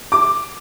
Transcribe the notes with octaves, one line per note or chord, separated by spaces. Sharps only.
D6